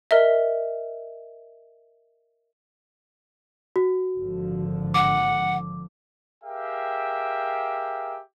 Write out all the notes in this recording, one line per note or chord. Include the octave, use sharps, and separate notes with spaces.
A#4 D#5 E5
F#4
G#1 D3 F3
F#5 D6
G4 G#4 A#4 E5 F5 G5